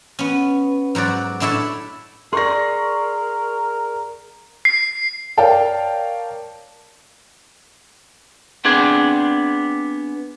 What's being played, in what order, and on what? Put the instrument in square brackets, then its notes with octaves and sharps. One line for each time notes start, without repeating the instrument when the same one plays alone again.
[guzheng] B3 C#4
G#2 F#3 F#4 D5
A2 D4 E4 C#5 E5 A5
[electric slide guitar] G#4 D5 [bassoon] A#4 [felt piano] C6 C#6 A#6
[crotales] C7
[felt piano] A#4 C#5 D5 F5 G5 A5
[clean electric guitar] B3 C4 D4 G#4